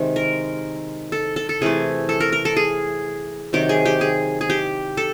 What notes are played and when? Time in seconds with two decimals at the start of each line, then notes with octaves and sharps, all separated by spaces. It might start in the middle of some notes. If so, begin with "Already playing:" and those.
Already playing: C3 D#3 G#3
0.16 A#4
1.12 A4
1.36 A4
1.49 A4
1.61 C3 E3 A3 G#4
2.09 A4
2.20 A#4
2.32 A#4
2.45 A4
2.57 G#4
3.53 C3 D#3 F#3 G4
3.69 G#4
3.85 G4
4.01 G#4
4.41 G#4
4.50 G4
4.97 A4